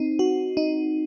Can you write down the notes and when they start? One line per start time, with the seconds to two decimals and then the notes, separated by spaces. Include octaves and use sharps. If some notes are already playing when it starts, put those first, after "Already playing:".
Already playing: C4 D#4
0.19 F#4
0.57 D#4